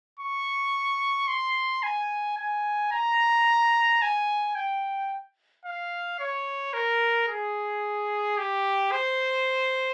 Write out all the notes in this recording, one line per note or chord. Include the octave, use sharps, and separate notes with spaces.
C#6
C6
G#5
G#5
A#5
G#5
G5
F5
C#5
A#4
G#4
G4
C5